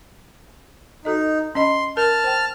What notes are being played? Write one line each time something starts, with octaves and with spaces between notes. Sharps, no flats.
D#4 F#4 A4 D#5
C#4 D#5 B5 C6
A#4 A5 F6
C5 G5